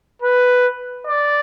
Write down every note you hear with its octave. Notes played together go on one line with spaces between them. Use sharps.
B4
D5